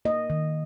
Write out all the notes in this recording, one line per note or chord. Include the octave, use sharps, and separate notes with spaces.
A#3 D#5
D#3